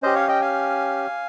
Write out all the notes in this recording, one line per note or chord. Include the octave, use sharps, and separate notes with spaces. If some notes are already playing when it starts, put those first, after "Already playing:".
C#4 G4 C5 D#5
C#5 F5
D#5 G5
F5 G#5